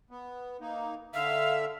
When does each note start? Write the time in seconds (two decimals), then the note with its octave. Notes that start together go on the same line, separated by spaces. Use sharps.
0.11 B3
0.61 A#3 D#4
1.14 D3 E5 F5